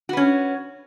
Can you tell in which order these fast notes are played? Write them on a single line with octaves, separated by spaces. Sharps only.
F#4 B4 C#4